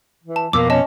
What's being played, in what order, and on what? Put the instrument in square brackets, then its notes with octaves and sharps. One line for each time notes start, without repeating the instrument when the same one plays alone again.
[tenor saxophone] E3
[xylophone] A5
[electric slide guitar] F2 B2 [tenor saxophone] A#3 [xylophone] D6 E6
[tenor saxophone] C#4 [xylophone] D#5 A5